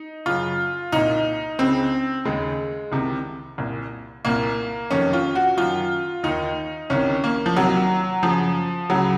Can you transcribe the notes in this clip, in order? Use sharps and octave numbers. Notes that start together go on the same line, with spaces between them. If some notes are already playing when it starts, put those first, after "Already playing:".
Already playing: D#4
F#2 C#3 F4
C2 A#2 D#4
C#2 C#3 C4
D#2 C#3 G#3
C2 C3 D#3
C2 A#2
C2 A#2 A#3
F2 C3 D#3 C#4
F4
F#4
F#2 D#3 F4
D#2 D#3 D#4
C2 C3 D#3 C#4
A#3
F3
C2 C3 D#3 F#3
F#2 C#3 F3
C#2 C#3 F#3